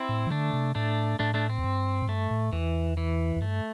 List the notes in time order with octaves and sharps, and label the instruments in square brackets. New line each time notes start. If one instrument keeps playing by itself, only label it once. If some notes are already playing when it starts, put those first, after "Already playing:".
Already playing: [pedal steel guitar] C4 E4
[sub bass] A2
E3
[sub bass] D3 [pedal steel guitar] A3 D4
[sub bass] C3
[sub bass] A2 [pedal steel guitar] A3 D4
[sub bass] A2 [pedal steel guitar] A3 D4
[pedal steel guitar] A3 D4
C4
[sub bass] E2
G2
A2
[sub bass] G2 [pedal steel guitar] A3
[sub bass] A2
[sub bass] E2 [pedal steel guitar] E3
[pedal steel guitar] E3
[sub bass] E2
[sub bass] G2 [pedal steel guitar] A3